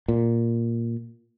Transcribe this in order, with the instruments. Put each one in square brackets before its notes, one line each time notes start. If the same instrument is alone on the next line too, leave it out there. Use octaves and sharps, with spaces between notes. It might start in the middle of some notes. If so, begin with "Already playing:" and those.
[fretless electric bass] A#2